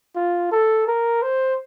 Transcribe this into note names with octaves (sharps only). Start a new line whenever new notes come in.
F4
A4
A#4
C5